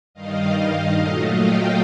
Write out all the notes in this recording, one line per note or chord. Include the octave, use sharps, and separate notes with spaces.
G2 D#3 G3 D#5 F5
D#5 F5
A#2 F#3 A3 D#5 F5
F5 G5